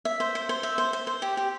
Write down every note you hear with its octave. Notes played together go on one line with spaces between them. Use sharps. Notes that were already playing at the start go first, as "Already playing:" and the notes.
E5
C5
C5
C5
E5
C5
C5
C5
G4
G4